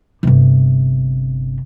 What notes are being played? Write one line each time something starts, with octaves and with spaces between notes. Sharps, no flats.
G1 C3